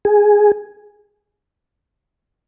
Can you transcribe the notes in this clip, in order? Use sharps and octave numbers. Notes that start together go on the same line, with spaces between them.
G#4